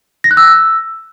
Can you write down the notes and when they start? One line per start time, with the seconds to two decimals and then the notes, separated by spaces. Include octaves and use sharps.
0.24 A#6
0.31 F#6
0.37 E6